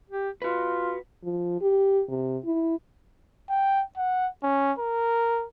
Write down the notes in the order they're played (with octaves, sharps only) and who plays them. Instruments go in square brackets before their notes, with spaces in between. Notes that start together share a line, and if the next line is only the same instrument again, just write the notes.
[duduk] G4
[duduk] F4 [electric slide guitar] F#4 B4
[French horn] F3
G4
C3
E4
[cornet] G5
F#5
C#4
A#4